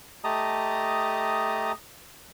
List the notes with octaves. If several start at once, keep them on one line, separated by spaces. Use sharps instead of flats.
A3 G4 D#5 A5 A#5 D#6